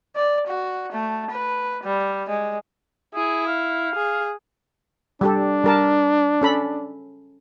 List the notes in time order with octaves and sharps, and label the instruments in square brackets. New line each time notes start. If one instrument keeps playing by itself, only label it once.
[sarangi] D5
F#4
A3
B4
G3
G#3
[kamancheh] E4 [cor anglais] G#4
[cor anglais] F5
[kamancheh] G#4
[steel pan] G3 G4 A4 [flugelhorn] D4
[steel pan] G3 A#4 A5
C#4 A4 B5